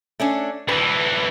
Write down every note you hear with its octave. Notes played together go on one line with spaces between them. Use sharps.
A3 C#4 D4
D2 E3 B4